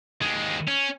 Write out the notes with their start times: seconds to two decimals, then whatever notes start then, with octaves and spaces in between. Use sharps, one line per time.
0.22 D#2 G#3
0.68 C#4